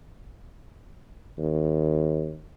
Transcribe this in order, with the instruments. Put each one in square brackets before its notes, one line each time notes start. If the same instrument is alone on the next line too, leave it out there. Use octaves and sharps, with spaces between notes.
[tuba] D#2